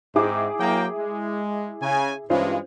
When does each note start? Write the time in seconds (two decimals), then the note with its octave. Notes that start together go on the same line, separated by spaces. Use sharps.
0.15 G#2 C4 E4 G#4 D6
0.60 F#3 A#3 G5
0.98 G#3
1.82 C#3 G#5
2.30 G2 E3 G#3 C#4 F4 C5